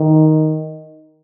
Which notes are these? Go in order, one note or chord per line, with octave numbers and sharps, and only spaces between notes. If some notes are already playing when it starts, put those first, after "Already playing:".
Already playing: D#3